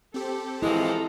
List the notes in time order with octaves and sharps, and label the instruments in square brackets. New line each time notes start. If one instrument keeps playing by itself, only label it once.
[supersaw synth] C4 G4 [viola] A4
[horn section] E3 F3 G#3 [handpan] E4 [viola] A4 A#5